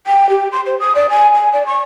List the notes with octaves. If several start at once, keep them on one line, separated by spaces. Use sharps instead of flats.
G5
G4
C6
C5
D#6
D5
G#5
G#5
D5
C#6